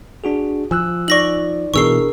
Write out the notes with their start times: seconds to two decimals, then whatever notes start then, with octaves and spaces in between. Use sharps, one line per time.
0.24 D4 F#4 G#4
0.71 F3 G#5 E6 F#6
1.08 D#4 D5 C#6 A#6 F#7
1.74 B2 E3 D4 G#4 A#4 C#6 E6 C7